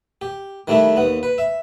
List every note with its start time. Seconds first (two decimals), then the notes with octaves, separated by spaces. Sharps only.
0.21 G4
0.68 D#3 G3 A3 D4 E4
0.97 D#2 B3
1.23 B4
1.38 E5